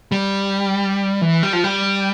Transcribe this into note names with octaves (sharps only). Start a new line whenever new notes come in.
G3
E3
G3
F3
G3